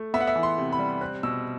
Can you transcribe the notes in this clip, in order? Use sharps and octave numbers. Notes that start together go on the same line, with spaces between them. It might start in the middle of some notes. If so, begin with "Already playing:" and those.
Already playing: A3
B3 E5
F#5
E5
E3
C6
C3
B5
G3
C4 F#6
B2 E6